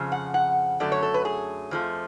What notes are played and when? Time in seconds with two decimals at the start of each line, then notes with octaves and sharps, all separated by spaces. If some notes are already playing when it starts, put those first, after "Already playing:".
Already playing: F2 C#3 F3
0.12 F#5
0.34 F#5
0.80 F#2 D3 F#3 A3 D5
0.92 C#5
1.03 A4
1.14 B4
1.25 G#4
1.71 F2 F3 A3